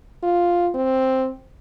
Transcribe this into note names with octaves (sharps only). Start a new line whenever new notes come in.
F4
C4